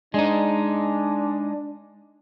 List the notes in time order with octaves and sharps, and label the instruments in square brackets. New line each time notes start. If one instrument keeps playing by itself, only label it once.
[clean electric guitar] G#3 D#4 [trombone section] D4